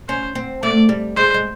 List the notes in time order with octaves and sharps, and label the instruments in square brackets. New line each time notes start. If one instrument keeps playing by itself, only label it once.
[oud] C#4 [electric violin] C5
[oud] C4
[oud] A3 [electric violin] D5
[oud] G3
[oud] G#3 [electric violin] C5
[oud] G#3